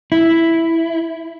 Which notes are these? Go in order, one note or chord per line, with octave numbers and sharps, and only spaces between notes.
E4